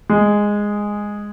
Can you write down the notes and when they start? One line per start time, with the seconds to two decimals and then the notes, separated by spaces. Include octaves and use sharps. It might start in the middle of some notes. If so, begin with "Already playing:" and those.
0.10 G#3